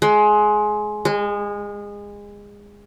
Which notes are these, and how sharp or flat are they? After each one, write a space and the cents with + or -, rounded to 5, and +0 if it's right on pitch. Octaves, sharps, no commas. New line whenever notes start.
G#3 +20
G#3 -25